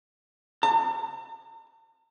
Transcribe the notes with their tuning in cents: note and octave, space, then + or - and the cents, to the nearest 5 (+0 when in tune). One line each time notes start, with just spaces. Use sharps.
A5 +45